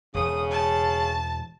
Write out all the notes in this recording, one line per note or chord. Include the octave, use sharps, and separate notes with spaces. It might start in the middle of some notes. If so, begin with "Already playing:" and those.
E1 C#3 D#6
A5